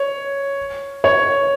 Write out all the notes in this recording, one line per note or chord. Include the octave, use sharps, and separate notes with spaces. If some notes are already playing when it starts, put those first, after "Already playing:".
Already playing: C#5
C#5